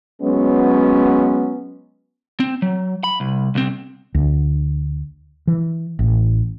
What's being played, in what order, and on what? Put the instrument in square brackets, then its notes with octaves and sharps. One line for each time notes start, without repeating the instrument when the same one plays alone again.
[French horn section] F#3 G#3 B3 C#4
[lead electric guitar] C4
F#3
B5
C2
C2 C4
[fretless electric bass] D2
E3
A1